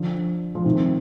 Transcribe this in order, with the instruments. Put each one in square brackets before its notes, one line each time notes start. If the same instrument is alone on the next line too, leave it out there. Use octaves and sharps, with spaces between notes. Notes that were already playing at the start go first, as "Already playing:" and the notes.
Already playing: [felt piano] D3 F3
F3
C3 D#3